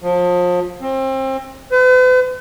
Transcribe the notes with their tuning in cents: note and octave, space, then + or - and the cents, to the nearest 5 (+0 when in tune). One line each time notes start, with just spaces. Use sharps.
F3 +30
C4 +30
B4 +45